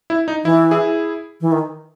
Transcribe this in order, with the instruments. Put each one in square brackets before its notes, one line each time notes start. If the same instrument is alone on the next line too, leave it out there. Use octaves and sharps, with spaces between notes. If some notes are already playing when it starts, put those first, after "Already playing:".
[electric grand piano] E4
D#4
[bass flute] E3 [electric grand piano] E4
[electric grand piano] E4 G#4
[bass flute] E3
D#3